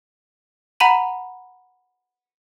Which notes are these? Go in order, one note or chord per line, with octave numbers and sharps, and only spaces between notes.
F#5 A#5 B5 D#7 F#7